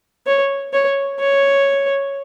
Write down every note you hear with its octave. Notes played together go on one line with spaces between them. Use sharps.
C#5
C#5
C#5